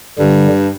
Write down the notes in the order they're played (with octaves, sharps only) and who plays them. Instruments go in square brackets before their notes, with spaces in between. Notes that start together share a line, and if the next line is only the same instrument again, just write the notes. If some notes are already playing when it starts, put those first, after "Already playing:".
[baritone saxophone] G2 [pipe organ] D3 G3